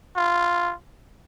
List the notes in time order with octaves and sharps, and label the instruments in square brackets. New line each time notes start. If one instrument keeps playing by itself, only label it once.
[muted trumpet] F4